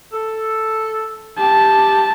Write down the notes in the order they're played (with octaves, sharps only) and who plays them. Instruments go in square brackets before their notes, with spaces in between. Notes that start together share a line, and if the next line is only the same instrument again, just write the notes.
[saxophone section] A4
[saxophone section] G4 [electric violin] A5